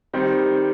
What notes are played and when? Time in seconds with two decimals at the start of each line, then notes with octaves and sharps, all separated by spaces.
0.14 D#3 G3 C4